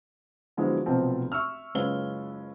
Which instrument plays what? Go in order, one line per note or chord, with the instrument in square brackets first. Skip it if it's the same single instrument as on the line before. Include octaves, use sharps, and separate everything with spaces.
[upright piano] D3 F3 F#3 G#3 B3 E4
F1 B1 F3 B3 C4 A5
E5 C#6 E6 F6
F#1 G#3 C#4 F4 B4 G7